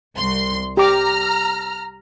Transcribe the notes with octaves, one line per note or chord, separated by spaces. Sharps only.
C2 C6
G4 A#5 D6 F6